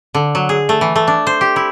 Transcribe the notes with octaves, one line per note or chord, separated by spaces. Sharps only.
D3
F#3
G#4
A3
E3
A3
D4
C5
G4
E4